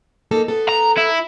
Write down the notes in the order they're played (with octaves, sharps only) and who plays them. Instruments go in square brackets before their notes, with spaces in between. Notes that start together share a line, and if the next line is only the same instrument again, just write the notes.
[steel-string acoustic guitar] A#3 D#4 A4
B3 A4
[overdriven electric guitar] A#5
E4